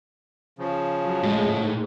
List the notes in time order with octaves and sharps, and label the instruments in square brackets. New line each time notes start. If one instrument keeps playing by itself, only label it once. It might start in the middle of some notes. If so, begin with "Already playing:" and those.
[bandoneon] C#3 F3
[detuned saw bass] F#3
[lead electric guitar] A2 [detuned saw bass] G#3
[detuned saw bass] G#2